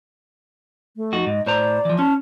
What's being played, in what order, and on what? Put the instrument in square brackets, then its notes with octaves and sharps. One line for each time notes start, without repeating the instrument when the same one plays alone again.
[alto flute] A3
[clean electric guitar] F2 D#4 F#4
[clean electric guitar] G#2 [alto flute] D#5
[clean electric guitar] A2 C5 A#5 [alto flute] D5
[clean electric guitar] E3 F3
[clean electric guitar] C#4 [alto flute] A5